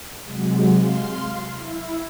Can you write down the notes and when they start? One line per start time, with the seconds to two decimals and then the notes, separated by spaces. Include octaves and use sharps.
0.24 C3 F#3 G#3
0.75 F5 C6
1.53 E4